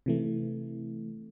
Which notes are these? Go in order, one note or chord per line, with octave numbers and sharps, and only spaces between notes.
C3 E3 A3